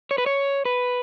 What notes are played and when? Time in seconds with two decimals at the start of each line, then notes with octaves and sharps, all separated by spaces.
0.11 C#5
0.18 B4
0.26 C#5
0.65 B4